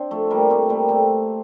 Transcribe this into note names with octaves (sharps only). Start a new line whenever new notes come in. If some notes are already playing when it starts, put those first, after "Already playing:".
Already playing: C4 D4
F3 A3
G3 A#3
A3 C4
G3 A#3
A3 C4